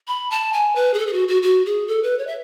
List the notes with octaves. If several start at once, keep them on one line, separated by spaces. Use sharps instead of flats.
B5
A5
G#5
B4
G#4
A4
G#4
F#4
F#4
F#4
G#4
A4
B4
C#5
E5